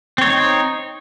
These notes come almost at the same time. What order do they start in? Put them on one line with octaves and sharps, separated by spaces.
C4 C#5 D#4